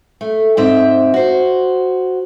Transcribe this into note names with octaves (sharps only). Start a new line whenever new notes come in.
A3
G#2 C4 E5
F#4 C5